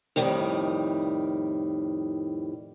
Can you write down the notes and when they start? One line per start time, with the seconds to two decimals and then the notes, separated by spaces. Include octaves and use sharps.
0.16 F2 A2 D#3 G3